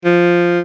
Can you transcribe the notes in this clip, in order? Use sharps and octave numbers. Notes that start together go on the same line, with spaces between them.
F3